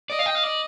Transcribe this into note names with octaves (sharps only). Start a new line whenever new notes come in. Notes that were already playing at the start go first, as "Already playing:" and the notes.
D5 D#5
F5
G5
F5
D5